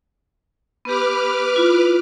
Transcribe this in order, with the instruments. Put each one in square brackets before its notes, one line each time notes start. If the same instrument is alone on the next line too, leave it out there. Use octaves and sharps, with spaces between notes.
[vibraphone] B3 G4 [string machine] B4 D6 F6
[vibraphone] E4 F4